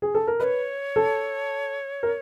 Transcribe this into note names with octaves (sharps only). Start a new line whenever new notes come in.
G#4
A4
A#4
B4 C#5 D#5
A4
A#4